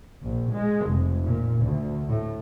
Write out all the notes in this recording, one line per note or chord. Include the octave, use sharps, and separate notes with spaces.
A#1
G#3
F1
A#2
D2
A2